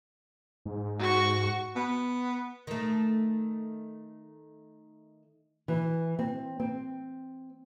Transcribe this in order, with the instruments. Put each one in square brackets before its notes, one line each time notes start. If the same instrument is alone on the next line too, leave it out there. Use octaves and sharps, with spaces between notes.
[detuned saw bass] G#2
[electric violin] F#4 C#6
[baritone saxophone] B3
[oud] D#3 A3
[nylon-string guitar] E3
C4
C4